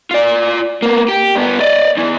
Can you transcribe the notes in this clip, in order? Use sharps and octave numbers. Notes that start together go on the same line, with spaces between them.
F4 D5
A#3 B3
G4
G2 B3
D5 D#5
E2 E3